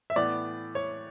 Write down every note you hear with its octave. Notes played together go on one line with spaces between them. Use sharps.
E5
A2 E3 B3 D5
C#5